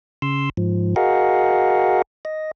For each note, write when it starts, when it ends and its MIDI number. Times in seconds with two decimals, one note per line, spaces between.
0.22 0.50 49
0.22 0.50 84
0.22 0.50 88
0.57 0.95 44
0.57 0.95 53
0.96 2.02 66
0.96 2.02 68
0.96 2.02 70
0.96 2.02 75
0.96 2.02 77
0.96 2.02 78
2.25 2.51 75